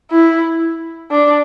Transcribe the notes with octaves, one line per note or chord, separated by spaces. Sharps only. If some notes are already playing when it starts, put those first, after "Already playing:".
E4
D4